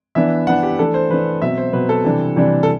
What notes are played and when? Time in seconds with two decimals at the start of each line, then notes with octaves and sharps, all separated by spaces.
0.15 E3 B3 D4 E5
0.47 E3 B3 D4 F#5
0.63 G4
0.79 E3 A3 D4 A4
0.94 C5
1.10 E3 A3 D4 B4
1.42 B2 F#3 C4 E5
1.58 C5
1.73 B2 F#3 C4 B4
1.89 A4
2.05 C3 E3 G3 D4
2.36 C3 E3 G3 D4
2.63 A4